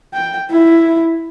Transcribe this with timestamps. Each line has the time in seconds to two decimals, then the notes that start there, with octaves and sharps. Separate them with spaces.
0.14 G5
0.51 E4